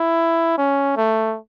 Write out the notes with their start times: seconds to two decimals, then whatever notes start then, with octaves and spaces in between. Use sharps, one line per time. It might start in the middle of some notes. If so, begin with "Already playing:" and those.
Already playing: E4
0.57 C#4
0.96 A3